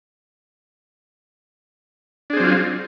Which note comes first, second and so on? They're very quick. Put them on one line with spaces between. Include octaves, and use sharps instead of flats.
D4 G#4 C4 F#3 F4